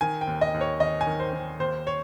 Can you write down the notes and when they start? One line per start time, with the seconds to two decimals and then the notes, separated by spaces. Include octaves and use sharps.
0.01 D#3 G#5
0.21 G5
0.27 D#2
0.41 D#5
0.54 D#2
0.61 C#5
0.80 D#3 D#5
1.01 G#5
1.07 D#3
1.20 C5
1.33 D#3
1.60 D#2 C5
1.87 C#5